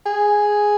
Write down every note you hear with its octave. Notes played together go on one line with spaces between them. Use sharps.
G#4